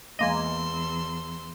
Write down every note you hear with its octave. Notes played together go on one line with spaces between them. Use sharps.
E2 G#3 A#3 D#5 C6 E6